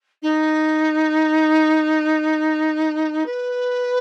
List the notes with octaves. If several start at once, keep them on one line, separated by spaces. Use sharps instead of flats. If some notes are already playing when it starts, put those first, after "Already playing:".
D#4
B4